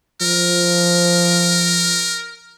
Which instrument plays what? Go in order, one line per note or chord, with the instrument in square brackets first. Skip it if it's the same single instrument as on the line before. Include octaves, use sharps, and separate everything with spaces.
[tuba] F3 [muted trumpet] A#4